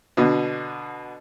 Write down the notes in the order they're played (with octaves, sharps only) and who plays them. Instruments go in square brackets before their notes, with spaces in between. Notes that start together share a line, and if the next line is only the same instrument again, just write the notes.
[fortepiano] B2 D3